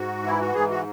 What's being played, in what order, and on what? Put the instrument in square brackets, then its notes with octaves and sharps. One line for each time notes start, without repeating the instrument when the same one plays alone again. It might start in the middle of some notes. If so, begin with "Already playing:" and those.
Already playing: [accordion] G#2 F#4
E3 E4
F#4
G#2 G#4
F#4